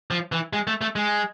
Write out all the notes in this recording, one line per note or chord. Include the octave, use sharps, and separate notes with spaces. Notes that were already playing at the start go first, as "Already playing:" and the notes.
F3
E3
G#3
A3
A3
G#3